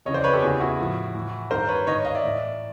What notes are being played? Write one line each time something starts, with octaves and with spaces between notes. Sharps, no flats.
F2 C#3 E3 C#5 D#5
C5 D5
B4 C#5
G4 A4
E2 C#3 E3 F#4 G#4
E4 F#4
A2 F3
A2 E3
G2 D#3 A#4 C5
B4 C#5
G#2 D#3 C#5 D#5
D#5 F5
D5 E5
A2 E3